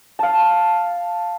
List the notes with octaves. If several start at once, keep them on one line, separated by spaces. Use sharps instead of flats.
F5 A5